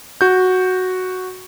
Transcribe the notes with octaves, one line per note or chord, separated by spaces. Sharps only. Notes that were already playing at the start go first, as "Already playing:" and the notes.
F#4 G6